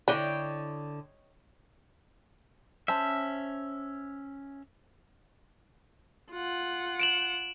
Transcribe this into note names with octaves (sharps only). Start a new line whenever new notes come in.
D3 D4 E4 C#5 D#5 G5
C#4 C5 E5 A5
F4 F#5
D7 E7 F#7